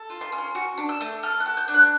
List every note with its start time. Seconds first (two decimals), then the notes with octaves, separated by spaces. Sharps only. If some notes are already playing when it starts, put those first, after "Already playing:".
Already playing: A4
0.10 F4
0.21 C6
0.32 C#4
0.38 C6
0.55 F#4 C#6
0.78 D4
0.89 E6
1.01 A3
1.23 A4 F6
1.40 F#6
1.46 F#4
1.57 G6
1.68 D4
1.74 F#6